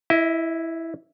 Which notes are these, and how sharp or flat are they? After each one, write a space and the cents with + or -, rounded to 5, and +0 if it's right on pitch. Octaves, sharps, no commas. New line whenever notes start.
E4 +0 D#5 +35